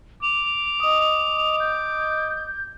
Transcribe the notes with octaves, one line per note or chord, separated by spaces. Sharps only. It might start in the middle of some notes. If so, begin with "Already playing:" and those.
D6 F7
D#5 D#6
G6